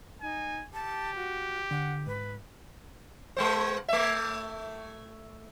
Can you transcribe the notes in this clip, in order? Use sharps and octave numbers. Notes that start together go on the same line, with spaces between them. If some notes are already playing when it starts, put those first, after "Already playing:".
D#4 G#5
G4 A5
F#4
D3 F#5
G#2 B4
G#3 B3 C5
A3 E5